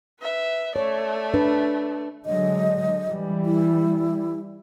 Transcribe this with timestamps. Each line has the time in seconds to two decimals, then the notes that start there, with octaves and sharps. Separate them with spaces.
0.20 B4 E5
0.76 A3 C#5 D5
1.34 D4 B4
2.26 D3 F#3 G#3 D#5
3.09 E3 G3
3.45 E4